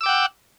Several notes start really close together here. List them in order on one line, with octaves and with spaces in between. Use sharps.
E6 D6 G5 F#5